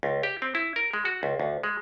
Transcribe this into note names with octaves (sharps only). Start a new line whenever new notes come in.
C#2
G4
C4
E4
A#4
G#3
F#4
C#2
D2
G#3